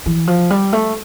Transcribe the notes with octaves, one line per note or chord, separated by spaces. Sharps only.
E3
F3
G3
A3